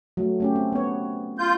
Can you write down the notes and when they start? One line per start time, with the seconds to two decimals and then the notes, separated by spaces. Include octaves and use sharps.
0.17 F#3 A3
0.40 A3 C#4 G4
0.56 C4
0.72 B3 C#5
1.39 F4 G6